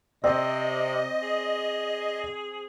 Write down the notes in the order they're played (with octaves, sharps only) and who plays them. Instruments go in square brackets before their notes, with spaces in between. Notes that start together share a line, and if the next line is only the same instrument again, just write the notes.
[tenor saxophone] C3 [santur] C4 [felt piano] D5 [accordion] D#5
[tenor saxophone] G#4